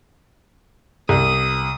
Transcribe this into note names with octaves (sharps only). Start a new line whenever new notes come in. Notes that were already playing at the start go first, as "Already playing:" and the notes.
C2 D#6